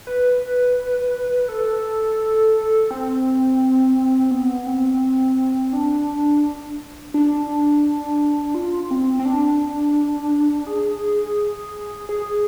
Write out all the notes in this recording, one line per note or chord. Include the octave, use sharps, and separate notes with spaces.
B4
A4
C4
B3
C4
D4
D4
F4
C4
C4
D4
G#4
G#4